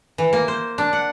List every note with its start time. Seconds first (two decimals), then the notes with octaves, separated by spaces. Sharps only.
0.18 E3
0.33 A#3
0.48 C5
0.78 D4
0.93 F#5